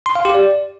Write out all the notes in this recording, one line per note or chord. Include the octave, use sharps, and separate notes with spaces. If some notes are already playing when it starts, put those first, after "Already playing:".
C6
F5
G4
D5